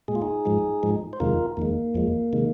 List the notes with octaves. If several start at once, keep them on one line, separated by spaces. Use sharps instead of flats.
A#2 G#3 G#4
F4
D#4 G#4
G#2 F3 G#3
G#2 F3 G#3
C5
F2 C3 D#3 G#3 F4 A#4
F2 D#3 G#3 A#3
F2 F3 G#3
C3 D#3 G#3